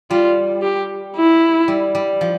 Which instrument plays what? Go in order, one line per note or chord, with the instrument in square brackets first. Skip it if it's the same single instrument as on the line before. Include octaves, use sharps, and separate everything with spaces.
[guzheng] G3 [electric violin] F4
[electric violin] G4
E4
[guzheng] G3
G3
F3